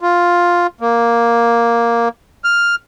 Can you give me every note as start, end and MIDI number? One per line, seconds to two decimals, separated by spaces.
0.01 0.67 65
0.81 2.08 58
2.44 2.75 89